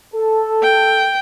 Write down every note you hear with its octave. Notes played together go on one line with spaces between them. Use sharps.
A4
G5